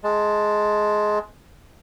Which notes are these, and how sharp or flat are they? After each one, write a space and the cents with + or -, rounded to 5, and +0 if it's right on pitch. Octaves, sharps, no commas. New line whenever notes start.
G#3 +15 A5 +0